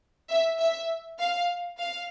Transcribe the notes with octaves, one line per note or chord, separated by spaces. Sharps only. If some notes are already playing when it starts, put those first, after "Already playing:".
E5
E5
F5
F5